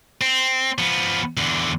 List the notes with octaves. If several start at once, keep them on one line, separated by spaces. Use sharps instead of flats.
C4
F3 B3
E2 D3